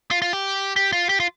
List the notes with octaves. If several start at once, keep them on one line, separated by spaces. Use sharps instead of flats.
F4
F4
G4
G4
F4
G4
F4